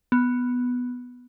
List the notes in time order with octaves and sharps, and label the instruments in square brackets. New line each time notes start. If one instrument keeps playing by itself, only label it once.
[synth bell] B3